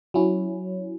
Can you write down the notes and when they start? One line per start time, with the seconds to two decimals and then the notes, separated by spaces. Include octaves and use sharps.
0.14 F#3 C#4 E4